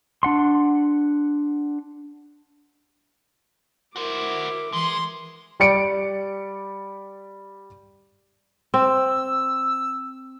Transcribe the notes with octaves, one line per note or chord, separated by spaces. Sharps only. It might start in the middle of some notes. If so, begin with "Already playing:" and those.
D4 F#5 C6
E4 F#4 A#4 C5 D6
E3 G#3 C6
G3 D5 C#7 D7
C4 E6